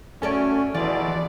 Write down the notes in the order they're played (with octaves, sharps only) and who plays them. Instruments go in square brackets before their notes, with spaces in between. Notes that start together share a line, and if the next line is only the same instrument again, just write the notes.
[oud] F#2 A4 D5 [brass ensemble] A3 F#4 [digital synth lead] C#4
[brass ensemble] E2 B2 [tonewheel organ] E3 [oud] F4 [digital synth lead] D5